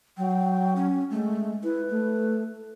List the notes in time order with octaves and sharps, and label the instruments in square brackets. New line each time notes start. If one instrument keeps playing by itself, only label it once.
[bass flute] F#3 [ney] G5
[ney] C#4
[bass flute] G#3 [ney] A3
[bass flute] E4 [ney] B4
[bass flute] A3